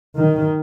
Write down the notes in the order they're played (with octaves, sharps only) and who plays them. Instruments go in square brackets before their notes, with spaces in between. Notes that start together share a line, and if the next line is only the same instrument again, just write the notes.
[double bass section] D#3